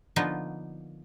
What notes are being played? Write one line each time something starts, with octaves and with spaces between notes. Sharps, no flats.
D3 F3 A#3 B3 D#4 F4